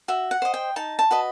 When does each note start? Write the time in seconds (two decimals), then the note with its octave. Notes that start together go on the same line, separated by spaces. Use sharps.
0.08 F#4 E5
0.31 F#5
0.42 C5 D#5
0.54 G5
0.76 D#4 A5
0.99 A5
1.11 F#4 B4 D#5